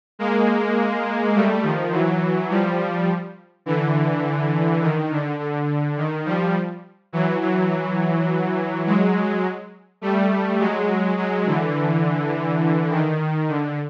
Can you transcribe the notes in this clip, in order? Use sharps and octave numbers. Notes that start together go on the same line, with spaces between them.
G#3 A#3
G3 A3
D#3 F3
E3 F#3
F3 G3
D3 E3
D#3
D3
D3
D#3
F3 G3
E3 F#3
E3 F#3
F#3 G#3
G3 A3
F#3 G#3
F#3 G#3
D3 E3
D#3
D3